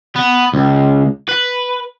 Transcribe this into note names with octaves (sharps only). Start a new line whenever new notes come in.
B3
C#2
B4